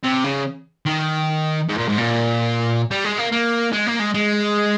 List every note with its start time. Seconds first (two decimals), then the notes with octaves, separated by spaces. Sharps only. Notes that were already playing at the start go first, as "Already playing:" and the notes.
0.03 C3
0.24 C#3
0.86 D#3
1.69 G#2
1.77 A#2
1.88 G#2
1.98 A#2
2.91 G3
3.04 G#3
3.18 A#3
3.32 A#3
3.73 G#3
3.87 A#3
4.00 G#3
4.14 G#3